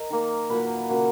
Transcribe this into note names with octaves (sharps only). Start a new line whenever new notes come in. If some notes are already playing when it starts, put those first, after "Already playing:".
Already playing: A#4 D#5
D#3 A#3
A#2 F#3 A#3 B4
C#3 F#3 A#3